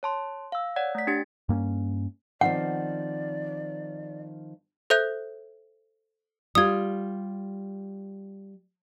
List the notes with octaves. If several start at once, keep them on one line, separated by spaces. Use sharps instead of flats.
C#5 A5 C6
F5 E6
C#5 D5 F#5 G#6
A3 B6
D4 G4 A6
G2 A#3 C4 C#4
D#3 F3 C4 D5 F#5
A4 C5 E5 F#6 G6
G3 F4 D#6 G#6